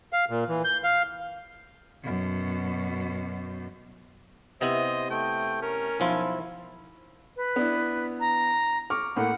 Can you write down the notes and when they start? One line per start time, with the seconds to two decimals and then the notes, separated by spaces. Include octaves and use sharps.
0.13 F5
0.30 A#2
0.49 E3
0.64 G6
0.84 F5
2.03 F#2 B2
4.61 C3 B3 E4 C5 D#5
5.10 A3 G5
5.62 C#4 A#4
6.00 B1 F3 E4 F4
7.36 B4
7.56 B3 D4 E4
8.20 A#5
8.90 C#6 D6 F6
9.16 A2 A3 A#3 F#5